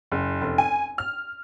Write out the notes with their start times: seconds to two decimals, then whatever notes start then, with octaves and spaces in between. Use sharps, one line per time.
0.12 F#1
0.41 F1
0.58 G#5
0.98 F6